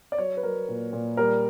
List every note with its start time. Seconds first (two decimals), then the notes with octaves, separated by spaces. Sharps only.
0.12 D5
0.18 F#3 C#5
0.37 B4
0.43 F#3 A#4
0.69 A#2
0.93 A#2
1.17 G3 A#4